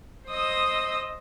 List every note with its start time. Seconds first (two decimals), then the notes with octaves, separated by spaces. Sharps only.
0.29 C5 D#5 D#6 E6